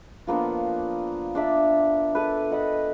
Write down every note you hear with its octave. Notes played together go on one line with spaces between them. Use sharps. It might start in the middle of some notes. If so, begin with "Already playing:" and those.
F3 A#3 B3 D4
D4 D5 E5
A4 B4
D#5 F#5 B5